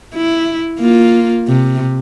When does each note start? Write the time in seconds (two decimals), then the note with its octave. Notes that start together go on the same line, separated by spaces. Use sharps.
0.15 E4
0.80 A#3 F4
1.47 C3